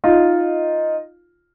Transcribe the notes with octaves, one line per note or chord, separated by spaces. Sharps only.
D#4 F4